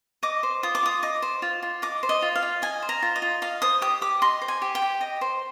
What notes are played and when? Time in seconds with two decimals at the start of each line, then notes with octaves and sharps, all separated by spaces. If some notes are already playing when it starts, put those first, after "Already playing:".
0.23 D#5 D6
0.43 C5
0.63 F4 D#6
0.75 D6
0.83 F4 D#6
1.03 D#5 D6
1.22 C5
1.42 F4
1.63 F4
1.82 D#5 D6
2.03 C5
2.09 D#5
2.22 F4
2.36 F5
2.43 F4
2.62 D#5 G#5
2.82 C5
2.89 A#5
3.02 F4
3.16 D#5
3.22 F4
3.42 D#5 F5
3.62 C5 D#6
3.82 G4 D#6
4.01 G4 D6
4.22 D#5 C6
4.42 C5
4.48 G#5
4.62 G4
4.75 G5
4.82 G4
5.01 D#5
5.21 C5